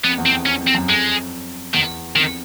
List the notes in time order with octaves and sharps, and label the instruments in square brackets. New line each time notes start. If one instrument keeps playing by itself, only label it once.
[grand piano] F2 [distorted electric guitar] B3
[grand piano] E2
[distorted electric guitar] C4
[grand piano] F2
[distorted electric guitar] C#4
[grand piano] F2
[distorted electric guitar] C4
[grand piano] F#2
[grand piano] F2 [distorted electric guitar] G#3
[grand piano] E2 [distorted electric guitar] D#3
[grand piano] F2 [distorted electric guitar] D#3